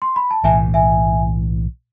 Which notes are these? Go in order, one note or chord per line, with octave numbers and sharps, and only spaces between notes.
C6
B5
A5
B1 A2 E3 E5 G#5
E5 G#5